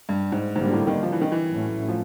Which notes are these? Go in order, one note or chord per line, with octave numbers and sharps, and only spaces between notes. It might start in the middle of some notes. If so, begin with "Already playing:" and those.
G2
G#2
G#2 D3 G3 A#3
A2
D#3
F3
E3
D#3
E3
A2 F#3 A3 C#4
F3